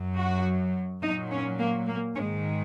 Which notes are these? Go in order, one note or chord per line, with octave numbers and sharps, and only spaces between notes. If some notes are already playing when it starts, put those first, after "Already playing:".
Already playing: F#2 F#3
F#4
A#2 F#3 D#4
C#4
A#3
A#3
G#2 D#3 G#3 C#4